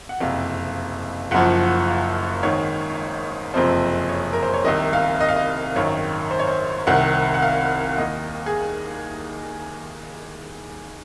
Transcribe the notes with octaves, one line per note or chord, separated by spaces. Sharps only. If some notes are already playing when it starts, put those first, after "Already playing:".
F#5
F#1 F2 C3 F5
F#1 F#2 F3 F#5
F5
G#1 G#2 D#3 C#5
F#1 F2 C3 F3 C5
C#5
A#4
C5
C#5
C2 C3 D#3 D#5
F5
D#5
F5
D#5
G#1 F#2 D#3 C#5
C5
C#5
C5
C2 C3 D#3 F#5
F#5
F5
D#2 D#3 D#5
G#4